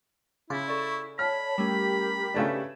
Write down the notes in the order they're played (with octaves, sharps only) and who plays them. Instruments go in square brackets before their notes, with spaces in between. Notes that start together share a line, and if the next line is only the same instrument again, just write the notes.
[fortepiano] C#3 [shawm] E4 [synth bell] C6 D6 A6
[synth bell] A4 D5 [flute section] C#6
[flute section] C#5 A5 [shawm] B5 [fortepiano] F6
[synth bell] G3 A3 C#4 [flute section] G4 A#4
[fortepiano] C#3 A3 D4 [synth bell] B4 G#6 E7